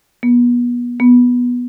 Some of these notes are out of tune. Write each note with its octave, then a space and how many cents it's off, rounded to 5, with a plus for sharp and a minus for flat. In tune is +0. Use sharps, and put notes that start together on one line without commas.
B3 -30
B3 -10